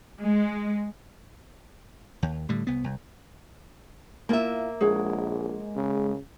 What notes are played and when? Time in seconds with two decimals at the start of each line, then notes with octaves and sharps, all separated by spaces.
0.23 G#3
2.23 D#2
2.49 A2 D3 G3
2.67 C2 B3
2.84 C2
4.29 A#3 E4 F4 E5 A#5
4.81 A#1 G#3 G#4 C#5 F#5
5.75 C#3